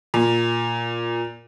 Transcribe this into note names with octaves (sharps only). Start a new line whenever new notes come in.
A#2